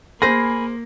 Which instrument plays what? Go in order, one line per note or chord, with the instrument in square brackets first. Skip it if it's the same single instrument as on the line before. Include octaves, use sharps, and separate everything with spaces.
[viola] A#3 [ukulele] G#4 C5 [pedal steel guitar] G#5 B5 [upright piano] A#6